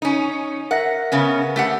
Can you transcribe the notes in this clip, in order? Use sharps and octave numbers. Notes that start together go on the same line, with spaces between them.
C#4 D#4
A#4 E5 F#5 A#6
C#3 B3 C#4
A3 G4 F#5